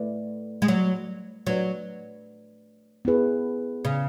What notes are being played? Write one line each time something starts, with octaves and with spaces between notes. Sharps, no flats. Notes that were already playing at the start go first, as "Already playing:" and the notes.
Already playing: A3 E4 B4 D5
G#3
F#3
F#3 A3 D4 F#4 B4 D5
B3 E4 G#4 B4
C#3